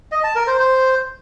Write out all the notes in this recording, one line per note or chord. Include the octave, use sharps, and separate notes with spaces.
D#5
A5
A#4
C5
C5